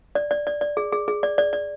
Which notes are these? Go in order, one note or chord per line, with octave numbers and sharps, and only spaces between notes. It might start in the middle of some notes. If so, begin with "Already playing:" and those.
D5
D5
D5
D5
G#4
G#4
G#4
D5
D5
D5